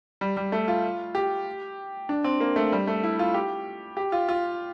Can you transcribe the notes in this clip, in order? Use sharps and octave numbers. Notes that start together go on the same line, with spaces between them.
G3
G3
A3
F4
G4
D4
C4
A#3
A3
G3
A3
E4
F4
G4
G4
F4
F4